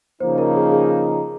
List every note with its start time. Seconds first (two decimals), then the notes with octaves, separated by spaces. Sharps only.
0.20 C#3 F3 A#3 D#4 C5
0.38 A#4
0.56 G#4
0.72 G#4